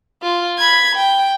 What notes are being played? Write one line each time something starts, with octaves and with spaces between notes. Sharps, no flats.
F4
B5 G#6
G5